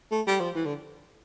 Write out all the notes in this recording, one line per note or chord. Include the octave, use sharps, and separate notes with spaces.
A3
G3
F3
E3
D3